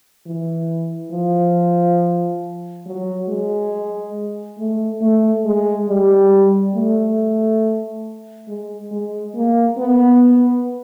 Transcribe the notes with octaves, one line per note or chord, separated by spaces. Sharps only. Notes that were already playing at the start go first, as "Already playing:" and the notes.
E3
F3
F#3
G#3
A3
A3
G#3
G3
A3
G#3
G#3
A#3
B3